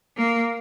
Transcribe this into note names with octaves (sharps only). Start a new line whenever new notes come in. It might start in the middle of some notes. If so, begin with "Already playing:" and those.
A#3